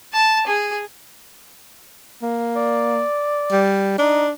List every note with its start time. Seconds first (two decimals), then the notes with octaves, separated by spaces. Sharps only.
0.13 A5
0.47 G#4
2.22 A#3
2.56 D5
3.52 G3
3.99 D4 D#4